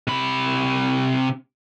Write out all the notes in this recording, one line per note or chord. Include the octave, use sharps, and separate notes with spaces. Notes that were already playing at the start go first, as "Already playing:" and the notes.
C3 B5